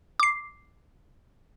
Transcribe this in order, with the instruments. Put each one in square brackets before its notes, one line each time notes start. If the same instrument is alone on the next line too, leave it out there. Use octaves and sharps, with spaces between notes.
[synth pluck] D6 C7